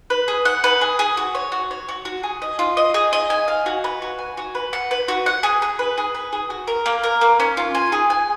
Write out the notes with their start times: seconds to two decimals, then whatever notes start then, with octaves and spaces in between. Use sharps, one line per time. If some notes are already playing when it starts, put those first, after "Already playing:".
0.10 B4
0.28 G#4
0.45 F#5
0.64 B4
0.81 G#4
0.99 G#4
1.17 F#4
1.35 C#5
1.52 F#4
1.71 C#5
1.89 F#4
2.05 F#4
2.23 G#4
2.42 D#5
2.59 F4
2.77 D#5
2.94 G#4
3.13 D#5
3.30 G#5
3.48 F5
3.66 F#4
3.84 B4
4.02 F#4
4.19 G#5
4.37 F#4
4.55 B4
4.73 F#5
4.91 B4
5.08 F#4
5.26 F#5
5.43 G#4
5.62 G#4
5.79 B4
5.98 G#4
6.15 B4
6.33 G#4
6.50 F#4
6.68 A#4
6.86 A#3
7.04 A#4
7.21 A#3
7.40 C#4
7.57 F4
7.75 G#5
7.92 G#4
8.10 G#5